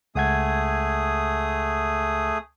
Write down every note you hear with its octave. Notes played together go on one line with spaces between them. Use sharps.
C#2 A3 G#4 F#5 D#6 G#6